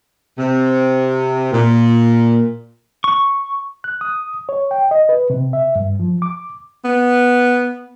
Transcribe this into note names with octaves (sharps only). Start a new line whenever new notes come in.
C3
A#2
C#6
F#6
D#6
C#5
G5
D#5
B4
C3
E5
G2
F3
D6
B3